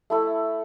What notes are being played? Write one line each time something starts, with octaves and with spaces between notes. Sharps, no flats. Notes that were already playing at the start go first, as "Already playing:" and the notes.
A3 E4 A4